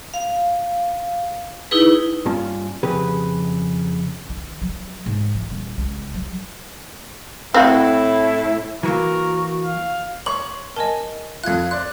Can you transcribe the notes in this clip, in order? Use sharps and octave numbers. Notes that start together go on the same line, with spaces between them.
F5
D#4 E4 G#4 B4
G2 A#3 C#4 F4 A5
F2 C#3 G4 G#4 B4
D#3
F#3
G#2
E3
D#1
C#2
F#3
A2 C4 E4 F#4
E3 F#3 A#3 F#4 A#4
F5
C#5 C6 C#6 F#7
A#4 D#5 G#5 A5
F2 F4 F#6 G#6
D5 C6 F#6